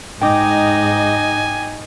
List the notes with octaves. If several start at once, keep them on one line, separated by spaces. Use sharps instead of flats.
G#2 D#4 D#5 G5 G#5 D6